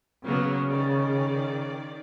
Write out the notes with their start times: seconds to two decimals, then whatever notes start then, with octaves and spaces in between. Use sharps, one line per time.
0.25 C#3 F#3 A#3 B3
0.70 D#3 D5